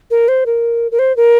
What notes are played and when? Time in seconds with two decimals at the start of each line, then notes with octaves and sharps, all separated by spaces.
0.11 A#4
0.28 C5
0.46 A#4
0.92 A#4
0.99 C5
1.17 A#4